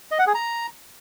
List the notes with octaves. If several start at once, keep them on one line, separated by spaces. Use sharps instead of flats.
D#5
F#5
G#4
A#5